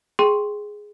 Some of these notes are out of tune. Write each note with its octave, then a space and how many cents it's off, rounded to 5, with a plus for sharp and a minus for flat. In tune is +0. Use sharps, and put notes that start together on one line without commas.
G#4 +0 G5 +0 C6 +0